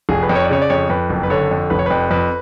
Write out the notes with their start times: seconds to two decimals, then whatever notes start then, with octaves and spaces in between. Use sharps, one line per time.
0.09 F1 G#4
0.23 B4
0.29 F2
0.35 C#5
0.44 D5
0.50 C#3 C#5
0.62 D5
0.70 F2 C#5
0.90 F2 B4
1.09 F#1
1.23 B4
1.30 D3 C#5
1.51 F2
1.70 F1 B4
1.79 C#5
1.86 F2 B4
2.11 F2 B4